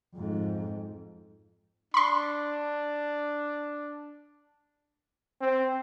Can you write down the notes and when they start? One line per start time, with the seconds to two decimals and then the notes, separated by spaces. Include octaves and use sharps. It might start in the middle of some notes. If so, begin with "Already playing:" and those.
0.15 F2 G#2
1.94 D4 B5 C6
5.41 C4